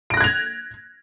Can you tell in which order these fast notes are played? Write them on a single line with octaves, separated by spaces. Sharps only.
D7 A#6 F#6 G#6 F7